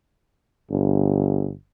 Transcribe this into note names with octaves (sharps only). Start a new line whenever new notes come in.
G1